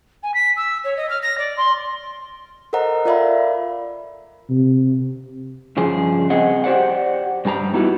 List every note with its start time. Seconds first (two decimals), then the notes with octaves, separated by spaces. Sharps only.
0.22 G#5
0.34 B6
0.56 E6
0.84 C#5
0.96 D#5
1.09 F6
1.22 A#6
1.37 D5
1.57 C6
2.73 A4 A#4 C5 D#5 F#5 A#5
3.05 F4 A#4 D5 E5 F5 B5
4.50 C3
5.77 G2 C#3 F3 G#4
6.30 C4 G#4 D#5 F#5
6.64 G4 C5 D5 F#5
7.45 G2 G3 G#5 A#5
7.74 B3 D#4 E4 F#4 G4